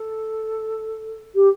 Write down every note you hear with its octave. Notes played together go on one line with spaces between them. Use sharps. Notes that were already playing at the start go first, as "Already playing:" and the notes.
Already playing: A4
G4